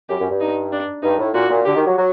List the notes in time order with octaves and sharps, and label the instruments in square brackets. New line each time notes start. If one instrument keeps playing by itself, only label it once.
[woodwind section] F#2 [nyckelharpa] G4
[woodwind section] F#2
G2
[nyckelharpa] D#4
D4
[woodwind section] G2 [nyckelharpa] D#4
[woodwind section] A2
[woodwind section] A#2 [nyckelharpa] F#4
[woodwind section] A#2
[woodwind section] D3 [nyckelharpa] G4
[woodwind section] D#3
F#3
F#3